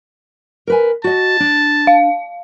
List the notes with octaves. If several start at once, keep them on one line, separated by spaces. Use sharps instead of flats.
A#4 B4 G#5
F#4 D#5 A5
D4
F5